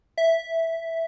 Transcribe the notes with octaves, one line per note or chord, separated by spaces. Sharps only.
E5